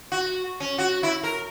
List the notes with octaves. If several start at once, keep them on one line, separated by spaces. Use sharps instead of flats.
F#4
C#4
F#4
E4
A#4